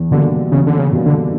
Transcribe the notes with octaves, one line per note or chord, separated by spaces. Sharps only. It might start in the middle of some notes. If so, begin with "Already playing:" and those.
Already playing: E2
B2 D3 G3 A#3
E2 C#3
D3
C#3
B2 G3 A#3
D3